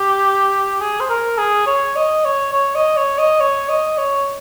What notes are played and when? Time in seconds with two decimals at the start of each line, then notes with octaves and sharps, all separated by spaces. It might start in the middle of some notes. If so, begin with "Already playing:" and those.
Already playing: G4
0.81 G#4
1.00 C5
1.10 A#4
1.38 G#4
1.67 C#5
1.96 D#5
2.25 C#5
2.53 C#5
2.75 D#5
2.97 C#5
3.18 D#5
3.40 C#5
3.69 D#5
3.98 C#5